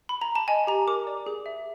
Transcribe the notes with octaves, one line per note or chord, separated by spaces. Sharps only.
B5
A#5
A5
D#5 G#5
G4 A#5
A#4 D6
D5
G#4
E5